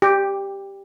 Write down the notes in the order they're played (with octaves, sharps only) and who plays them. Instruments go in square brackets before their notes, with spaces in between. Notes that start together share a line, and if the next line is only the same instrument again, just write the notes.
[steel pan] G4